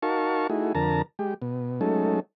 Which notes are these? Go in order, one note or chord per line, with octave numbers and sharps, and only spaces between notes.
D#4 F#4 A#4 F5 A5 C#6
A3 D#4 E4 F#4 G#4
F2 D3 A#4 A5 A#5
G#3 G4
B2
F#3 G#3 A3 C#4 D#4 A4